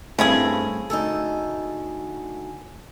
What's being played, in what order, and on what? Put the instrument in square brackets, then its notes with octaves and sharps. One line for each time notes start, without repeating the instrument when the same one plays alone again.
[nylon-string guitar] G2 C4 [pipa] C#3 E4 G#4 [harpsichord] A3
[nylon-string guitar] D2 D#4 [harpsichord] A4 [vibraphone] G#5